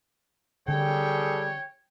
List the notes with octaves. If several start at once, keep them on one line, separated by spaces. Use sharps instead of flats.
D3 G3 G#4 A4 C#5 G5